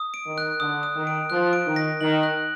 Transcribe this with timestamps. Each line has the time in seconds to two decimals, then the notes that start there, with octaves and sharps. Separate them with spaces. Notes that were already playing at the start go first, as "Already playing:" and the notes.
Already playing: D#6
0.14 D7
0.26 D#3
0.38 F#6
0.60 D3 D#6
0.83 D#6
0.96 D#3
1.07 D7
1.30 F3 F#6
1.53 D7
1.66 D#3
1.76 A#6
2.01 D#3 F#7
2.23 F#6